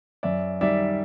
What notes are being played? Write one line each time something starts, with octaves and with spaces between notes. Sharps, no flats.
F#2 D5 E5
D#3 G3 D5 E5